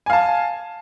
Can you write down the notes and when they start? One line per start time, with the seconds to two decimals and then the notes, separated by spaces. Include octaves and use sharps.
0.06 G#5
0.10 F5
0.13 A5